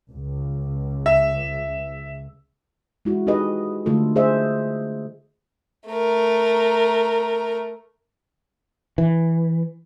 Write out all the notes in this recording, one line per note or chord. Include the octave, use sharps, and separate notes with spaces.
C#2
E5
G#3 E4 F#4
D#4 G4 G#4 B4 D#5
D3 A3 F4 A4
G#4 C5 D#5 E5
A3 A#4
E3